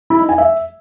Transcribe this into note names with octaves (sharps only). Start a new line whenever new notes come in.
E4
D#4
G#5
E5